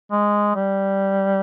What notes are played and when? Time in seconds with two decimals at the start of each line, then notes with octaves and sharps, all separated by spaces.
0.11 G#3
0.56 G3